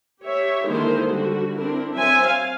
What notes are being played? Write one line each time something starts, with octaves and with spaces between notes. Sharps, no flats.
G4 C#5 E5
D3 D#3 G#3 A#3 E4 C5
D3 G3 F#4
C4 D4 E4 A#4
F#3 C4 C5 E5 G#5
F5